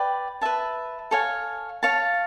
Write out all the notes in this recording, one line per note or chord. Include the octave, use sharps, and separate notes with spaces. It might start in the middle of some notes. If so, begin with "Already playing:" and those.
Already playing: B4 D5 G5
B4 E5 A5
A4 C#5 F5 G#5
C#5 F5 A5